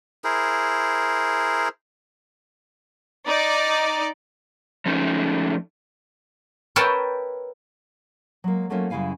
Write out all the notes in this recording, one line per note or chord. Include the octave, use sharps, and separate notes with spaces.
E4 G#4 A#4 C5
D#4 D5
F3 A3 C#4 D#4
A#4 B4 C#5 E5 G5 A5
F#3 G#3 A#3
F#3 A3 A#3 C#4 F4 E5
F#2 C#3 G3 E4 F5 G#5